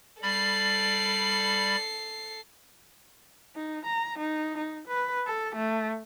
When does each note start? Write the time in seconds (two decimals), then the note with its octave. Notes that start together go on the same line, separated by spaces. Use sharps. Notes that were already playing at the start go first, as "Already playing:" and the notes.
0.22 G3 A4 D5 B5 C7
3.56 D#4
3.86 A#5
4.19 D#4
4.58 D#4
4.88 B4
5.27 A4
5.55 A3